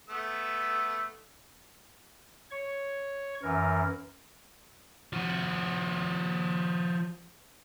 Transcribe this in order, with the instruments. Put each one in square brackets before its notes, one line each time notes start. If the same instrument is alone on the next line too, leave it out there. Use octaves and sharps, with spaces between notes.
[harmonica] A3 B3 E6
[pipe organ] C#5 C#6
F#2 E3 A#4
[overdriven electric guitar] F3 F#4